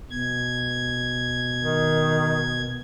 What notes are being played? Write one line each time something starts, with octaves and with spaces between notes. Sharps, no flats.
B2 G#6
D#3